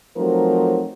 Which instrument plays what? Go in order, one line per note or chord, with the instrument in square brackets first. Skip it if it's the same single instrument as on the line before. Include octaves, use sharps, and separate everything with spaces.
[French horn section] F3 F#3 A3 C4 D#4 A#4